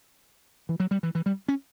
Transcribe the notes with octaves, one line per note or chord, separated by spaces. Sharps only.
E3
F#3
G3
E3
E3
G3
C#4